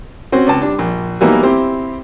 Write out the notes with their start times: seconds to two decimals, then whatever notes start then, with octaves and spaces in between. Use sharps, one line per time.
0.32 C4 C#4 F#4 C5
0.47 C#2 C4 A5
0.62 G3 D4
0.79 A#1
1.21 E3 F#3 G3 A#3 B3 D#4
1.43 C4 E4 G4 C5